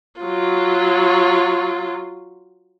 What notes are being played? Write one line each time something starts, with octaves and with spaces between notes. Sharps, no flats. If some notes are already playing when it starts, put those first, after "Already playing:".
F#3 F4